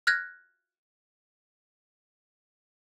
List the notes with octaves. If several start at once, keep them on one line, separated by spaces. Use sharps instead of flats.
F6 F#6 G#6 A#6